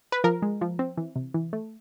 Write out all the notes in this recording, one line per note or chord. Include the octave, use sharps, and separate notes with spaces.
B4
F3 A#4
G#3
F3
C4
E3
C3
E3
A3